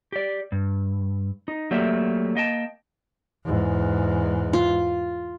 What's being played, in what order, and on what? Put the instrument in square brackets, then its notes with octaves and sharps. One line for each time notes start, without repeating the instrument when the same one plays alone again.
[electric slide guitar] G4 D5
G2
D#4
F#3 A3 A#3 G4 D5 E5
A#3 D#5 G5 A5
[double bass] E2 G#2
[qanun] F4